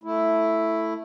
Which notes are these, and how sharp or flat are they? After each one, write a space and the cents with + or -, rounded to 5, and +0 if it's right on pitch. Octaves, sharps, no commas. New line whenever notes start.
A3 +0 E4 +0